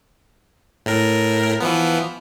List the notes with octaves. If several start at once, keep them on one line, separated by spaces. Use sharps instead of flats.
A2 A#4
E3 F3 B3